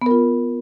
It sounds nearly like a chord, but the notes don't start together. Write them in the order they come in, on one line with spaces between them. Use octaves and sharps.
B3 A#4 F4